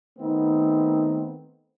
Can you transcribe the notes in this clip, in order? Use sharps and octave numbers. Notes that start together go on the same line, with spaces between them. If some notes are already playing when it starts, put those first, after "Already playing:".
D#3 A3 B3 C4 D#4